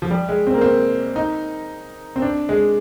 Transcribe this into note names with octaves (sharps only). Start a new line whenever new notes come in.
F3
G3
G#3
C4
A#3
C4
D#4
C4
D4
G#3